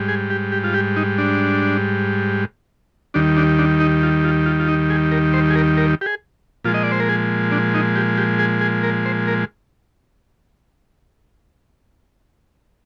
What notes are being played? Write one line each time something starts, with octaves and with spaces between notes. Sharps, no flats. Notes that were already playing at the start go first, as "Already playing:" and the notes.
Already playing: G#2 G3
G#4
G4
G4
F4
G4
D#4
D4
D#2 D#3 G3 D4
D4
D4
D#4
F4
F4
F4
F4
D#4
G#4
A#4
C5
G#4
A#4
A#4
G4
G#4
A#2 F3 G#3 F4
D#5
D5
C5
A#4
G#4
D4
D#4
G4
G4
G#4
G#4
A#4
C5
A#4